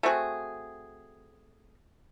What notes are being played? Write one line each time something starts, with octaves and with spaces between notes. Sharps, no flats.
A3 C4 F#4 G#4